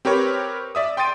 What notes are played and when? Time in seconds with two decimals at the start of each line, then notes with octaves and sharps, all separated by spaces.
0.05 C4 G4 A#4 B4 C#5
0.75 D5 E5 D#6
0.97 G5 C6 D#6 A6 D7 D#7